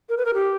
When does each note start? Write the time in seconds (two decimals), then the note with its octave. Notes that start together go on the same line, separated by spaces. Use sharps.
0.09 A#4
0.17 B4
0.25 A#4
0.34 G4